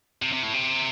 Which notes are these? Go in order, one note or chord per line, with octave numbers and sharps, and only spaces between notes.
C3
C3
A2
C3